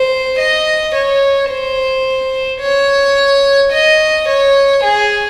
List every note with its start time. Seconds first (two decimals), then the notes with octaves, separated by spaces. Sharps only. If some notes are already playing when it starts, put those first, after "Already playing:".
Already playing: C5
0.39 D#5
0.94 C#5
1.50 C5
2.61 C#5
3.73 D#5
4.28 C#5
4.84 G#4